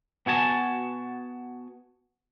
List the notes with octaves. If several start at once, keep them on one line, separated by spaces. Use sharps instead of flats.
B3 F#4 G#5 A5